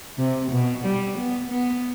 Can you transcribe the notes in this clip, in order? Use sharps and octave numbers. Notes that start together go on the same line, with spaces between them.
C3
B2
G3
B3
B3